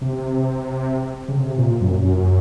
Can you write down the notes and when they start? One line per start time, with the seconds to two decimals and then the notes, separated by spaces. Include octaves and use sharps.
0.02 C3
1.29 C#3
1.37 C3
1.58 A#2
1.81 F#2
2.04 F#2